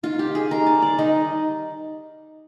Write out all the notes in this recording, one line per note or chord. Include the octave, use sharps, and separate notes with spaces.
D#3 F4
G4
D#3
G#4
D#3 A#4
D5
G3
D5
D#3 D#4